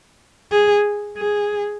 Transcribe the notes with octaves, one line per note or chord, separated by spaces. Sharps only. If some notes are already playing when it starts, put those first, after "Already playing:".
G#4
G#4